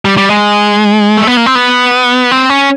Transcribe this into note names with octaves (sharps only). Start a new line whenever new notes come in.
G3
G3
G#3
A3
B3
A#3
C4
B3
C4
C#4